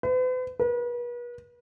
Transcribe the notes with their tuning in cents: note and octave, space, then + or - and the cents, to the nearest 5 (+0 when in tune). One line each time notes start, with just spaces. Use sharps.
B4 +45
B4 -40